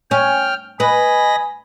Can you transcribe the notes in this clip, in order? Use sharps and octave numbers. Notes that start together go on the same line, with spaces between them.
C#4 G5 F6
B4 D#5 G#5 B5 A#6